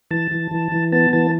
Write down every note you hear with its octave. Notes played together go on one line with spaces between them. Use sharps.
E3 A5
E3
E3
E3
B3 A5
E3 A5